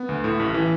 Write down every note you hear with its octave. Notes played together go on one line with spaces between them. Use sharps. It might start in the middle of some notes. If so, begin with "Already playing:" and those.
Already playing: B3
D2
A2
A1
E3